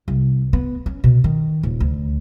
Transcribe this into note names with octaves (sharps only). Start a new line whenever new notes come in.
C2
B3
C#4
B2
D#3
D#1
D2